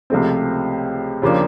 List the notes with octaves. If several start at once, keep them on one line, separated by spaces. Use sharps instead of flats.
C#2 C3 F3 A3 C4
D#2 C#3 F3 A#3 D4